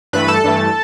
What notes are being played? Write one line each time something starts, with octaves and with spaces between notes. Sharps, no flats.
G2 E3 A3 B4 B5
A4 A5
G2 E3 A3